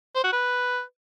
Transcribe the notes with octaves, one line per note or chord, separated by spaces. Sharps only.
C5
F#4
B4